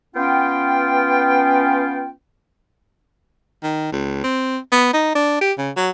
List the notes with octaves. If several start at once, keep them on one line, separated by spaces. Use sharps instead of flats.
B3 C#4 F4 G5
D#3
C#2
C4
B3
D#4
D4
G4
C#3
F#3